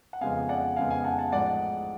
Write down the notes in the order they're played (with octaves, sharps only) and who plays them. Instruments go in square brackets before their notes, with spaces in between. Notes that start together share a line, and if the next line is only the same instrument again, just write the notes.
[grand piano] F#5
F2 C#3 G#3 B3 F5 G#5
D5 F#5
F2 C#3 G#3 B3 F5 G#5
F5 G#5
F#5 A5
F#5 A5
A1 G#2 F3 G#3 D5 F#5